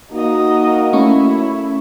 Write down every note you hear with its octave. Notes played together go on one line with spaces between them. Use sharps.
A#3 D#4 F#4 D#5
A3 C#4 E4 C#6